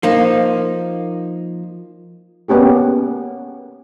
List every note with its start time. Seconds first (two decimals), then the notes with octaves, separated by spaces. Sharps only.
0.03 F3 A#3 D#4
2.48 A#3 B3 C#4 G4 G#4